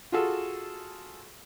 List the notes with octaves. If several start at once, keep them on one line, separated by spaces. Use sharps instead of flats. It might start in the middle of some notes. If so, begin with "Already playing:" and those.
F4 F#4 G#4 A4